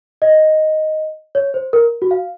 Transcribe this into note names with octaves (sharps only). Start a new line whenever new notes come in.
D#5
C#5
C5
A#4
F#4
F5